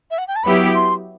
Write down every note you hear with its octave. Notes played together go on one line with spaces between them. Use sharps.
E5
F#5
G5
A5
F#3 B3 E4 G4 B5
C6